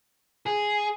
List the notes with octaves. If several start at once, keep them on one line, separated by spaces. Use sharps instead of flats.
G#4